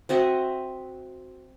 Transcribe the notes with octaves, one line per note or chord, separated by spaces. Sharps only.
C4 F#4 D#5 E5